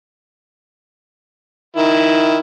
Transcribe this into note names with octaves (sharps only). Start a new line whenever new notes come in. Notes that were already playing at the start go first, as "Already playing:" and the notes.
D#3 E4